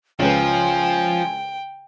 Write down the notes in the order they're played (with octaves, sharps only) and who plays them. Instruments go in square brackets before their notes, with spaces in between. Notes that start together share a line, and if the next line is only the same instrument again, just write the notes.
[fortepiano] C#2 C#3 B4 [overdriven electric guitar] F3 [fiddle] G5 [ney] G#5